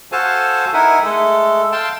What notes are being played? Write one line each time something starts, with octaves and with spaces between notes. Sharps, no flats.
F#4 A4 C5 F5 G#5 A5
D#4 E4 A#4 E5 F#5 G#5
G#3 A3 A4
F5 G5 A5 C6